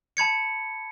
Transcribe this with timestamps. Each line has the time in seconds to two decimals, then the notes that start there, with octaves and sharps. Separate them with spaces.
0.17 A5 B5 G#6 C#7